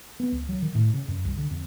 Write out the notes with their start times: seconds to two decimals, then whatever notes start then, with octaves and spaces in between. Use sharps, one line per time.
0.20 B3
0.32 C#2
0.49 F#3
0.62 D#3
0.75 A2
0.94 C#3
1.08 F#2
1.25 C2
1.37 D3
1.51 F2